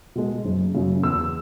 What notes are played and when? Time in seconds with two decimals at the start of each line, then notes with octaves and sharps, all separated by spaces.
0.15 B2 G#3
0.45 F#1
0.74 F#2 C#3
1.03 E2 E6